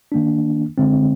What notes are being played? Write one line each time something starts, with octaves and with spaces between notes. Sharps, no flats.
D#3 A#3 D4
D3 G#3 C4